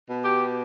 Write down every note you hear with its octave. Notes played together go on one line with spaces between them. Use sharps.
B2
G4